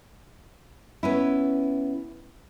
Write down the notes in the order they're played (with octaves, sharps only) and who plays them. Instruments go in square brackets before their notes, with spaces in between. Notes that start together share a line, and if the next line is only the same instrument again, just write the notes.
[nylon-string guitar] B3 C#4 E4